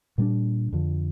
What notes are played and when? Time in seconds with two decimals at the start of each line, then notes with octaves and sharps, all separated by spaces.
0.18 A#2 G3 A#3 D4
0.73 F2 D3 F3